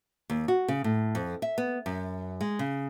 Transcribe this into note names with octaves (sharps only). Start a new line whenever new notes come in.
D#2
F#4
C#3
A2
F2
E5
B3
F#2
G#3
C#3